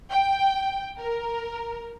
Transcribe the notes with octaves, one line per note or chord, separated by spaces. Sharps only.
G5
A#4